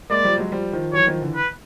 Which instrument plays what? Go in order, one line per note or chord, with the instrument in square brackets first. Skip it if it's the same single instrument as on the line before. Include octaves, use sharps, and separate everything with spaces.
[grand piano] G#3 A#3 [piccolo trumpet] D5
[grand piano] F3 G3
F#3 G#3
F3 G3
D#3 F3
[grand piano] E3 F#3 [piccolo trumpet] C#5
[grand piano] D#3 F3
D3 E3
[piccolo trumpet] B4